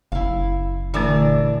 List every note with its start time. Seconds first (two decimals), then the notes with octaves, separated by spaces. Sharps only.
0.12 F#1 E4 F5
0.94 A#2 D3 E3 A3 D4 A#4